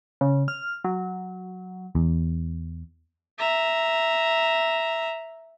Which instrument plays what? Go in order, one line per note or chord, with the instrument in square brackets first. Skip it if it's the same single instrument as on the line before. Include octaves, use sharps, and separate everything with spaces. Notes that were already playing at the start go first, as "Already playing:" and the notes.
[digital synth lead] C#3
F6
F#3
[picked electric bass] E2
[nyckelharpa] E5 A#5